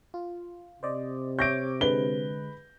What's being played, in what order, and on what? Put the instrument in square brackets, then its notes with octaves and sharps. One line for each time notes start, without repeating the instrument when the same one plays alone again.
[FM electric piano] F4
[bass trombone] C3 [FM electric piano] C5 D5 D#5
[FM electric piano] C#5 E5 D6 [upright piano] G6 A#6 D7
[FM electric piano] D3 G#3 [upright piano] B4 G7